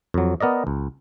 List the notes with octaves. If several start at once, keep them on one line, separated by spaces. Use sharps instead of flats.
F2 F#3
B3 A#4 D5 D#5
C#2